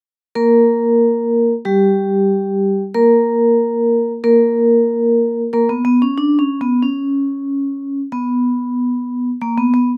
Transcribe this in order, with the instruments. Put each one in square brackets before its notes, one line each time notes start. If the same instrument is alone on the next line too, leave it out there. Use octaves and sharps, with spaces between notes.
[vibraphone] A#3 A#4
G3 G4
A#3 A#4
A#3 A#4
A#3 A#4
B3
B3
C#4
D4
C#4
B3
C#4
B3
A#3
B3
B3